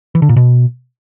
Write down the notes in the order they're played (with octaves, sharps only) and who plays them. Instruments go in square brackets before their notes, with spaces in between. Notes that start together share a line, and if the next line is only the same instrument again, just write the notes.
[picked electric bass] E3
D3
A#2
B2